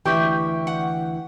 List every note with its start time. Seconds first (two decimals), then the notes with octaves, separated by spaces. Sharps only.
0.06 D2 E3 G4 E5 G5 C#6 G6
0.67 F#5